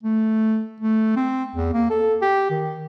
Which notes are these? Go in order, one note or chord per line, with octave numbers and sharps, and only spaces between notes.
A3
A3
C4
E2
A#3
A4
G4
D#3